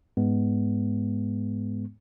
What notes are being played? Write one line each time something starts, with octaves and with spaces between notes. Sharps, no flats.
G#2 G#3 B3